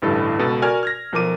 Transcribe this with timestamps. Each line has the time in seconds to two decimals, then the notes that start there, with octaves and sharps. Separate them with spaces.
0.02 A1 D2 G2 E4 A4
0.39 C#2 B2 A4 B4
0.62 F#4 A#4 D5 G#5 F6 G#6
0.83 F6 G#6 A#6
1.12 B1 F3 A#4 D6 D#7